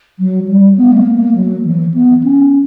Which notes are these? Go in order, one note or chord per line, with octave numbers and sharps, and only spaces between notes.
F#3
G3
B3
G3
A#3
A#3
F#3
E3
B3
C#4